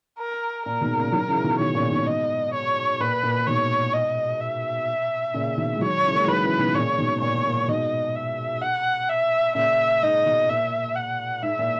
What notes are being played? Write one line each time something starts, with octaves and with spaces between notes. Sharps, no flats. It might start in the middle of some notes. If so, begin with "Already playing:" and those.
A#4
A#2 A#4
G#2 B2
A#2 C#3
D#3 F#3
C#3 E3
B2 D#3
B2 D#3 C#5
A#2 C#3
G#2 B2
D#5
C#5
A#2 B4
A#2
G#2 B2 C#5
D#5
E5
A#2 C#3
B2 D#3
G#3
D#3 F#3 C#5
C#3 E3
A#3
G#3
D#3 F#3 B4
C#3 E3
B2 D#3
A#2 C#3 C#5
G#2 B2
A#2 C#5
A#2
G#2 B2 D#5
E5
F#5
E5
A#2 C#3 E5
G#2 D#5
G#2 B2
A#2 E5
F#5
G#2 E5
A#2